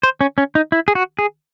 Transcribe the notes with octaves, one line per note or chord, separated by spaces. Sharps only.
C5
C#4
C#4
D#4
E4
G#4
F#4
G#4